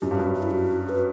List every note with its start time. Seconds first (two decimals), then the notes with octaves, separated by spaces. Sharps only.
0.02 F#2 G4
0.11 G2
0.18 F#2 F#4
0.34 F#4
0.43 E4
0.50 F#4
0.89 B4